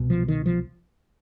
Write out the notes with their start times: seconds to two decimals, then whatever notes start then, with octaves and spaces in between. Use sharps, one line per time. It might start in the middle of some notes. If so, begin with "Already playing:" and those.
Already playing: C2 B2
0.10 F3
0.28 D#3
0.46 F3